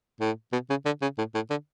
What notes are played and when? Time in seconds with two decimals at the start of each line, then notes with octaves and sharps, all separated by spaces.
0.21 A2
0.53 B2
0.70 C#3
0.86 D3
1.02 C#3
1.18 A2
1.35 A2
1.50 D3